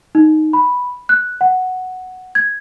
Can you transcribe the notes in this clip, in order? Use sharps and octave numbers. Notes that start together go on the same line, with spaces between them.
D#4
B5
F#6
F#5
G#6